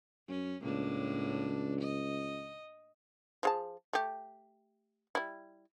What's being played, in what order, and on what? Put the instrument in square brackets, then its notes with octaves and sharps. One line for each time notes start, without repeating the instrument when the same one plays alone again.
[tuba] F#2 [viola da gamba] C#4
[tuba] C#2 [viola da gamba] A2 A#3 D4
[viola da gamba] D#5
[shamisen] F3 G#4 A5
A3 G4
G3 E4